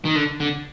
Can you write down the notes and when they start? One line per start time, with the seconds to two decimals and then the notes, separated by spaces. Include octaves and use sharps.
0.05 D#3
0.15 D3
0.40 D3